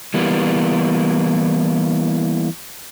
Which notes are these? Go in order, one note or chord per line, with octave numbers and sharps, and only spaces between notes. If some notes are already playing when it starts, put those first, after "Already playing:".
E3 G3 A#3 B3